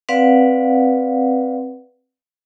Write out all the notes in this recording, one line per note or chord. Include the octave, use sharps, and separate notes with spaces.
C4 B4 D5 F5 F#5